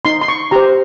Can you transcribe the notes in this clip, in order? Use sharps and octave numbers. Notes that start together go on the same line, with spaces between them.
D#4 C6
C6
C#6
G4 C5 A#5